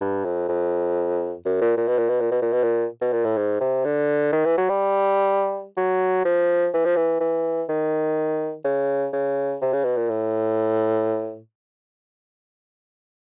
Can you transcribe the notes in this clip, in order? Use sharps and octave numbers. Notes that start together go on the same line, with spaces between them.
G2
F2
F2
F#2
A#2
A#2
B2
A#2
B2
A#2
B2
A#2
B2
A#2
B2
A#2
A2
G#2
C3
D3
D#3
E3
F#3
G3
F#3
F3
E3
F3
E3
E3
D#3
C#3
C#3
C3
C#3
B2
A#2
A2